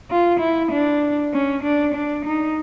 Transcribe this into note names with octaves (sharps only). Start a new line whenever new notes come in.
F4
E4
D4
C#4
D4
D4
D#4